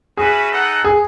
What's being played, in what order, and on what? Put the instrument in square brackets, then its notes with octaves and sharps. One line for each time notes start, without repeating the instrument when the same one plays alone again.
[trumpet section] C#4 F#4 B4 E5 [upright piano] G#4
[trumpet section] D#4 A4 D#5 F#5
[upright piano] G#4